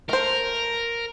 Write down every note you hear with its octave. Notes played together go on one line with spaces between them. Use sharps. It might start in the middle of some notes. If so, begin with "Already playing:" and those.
A3 A#4 C5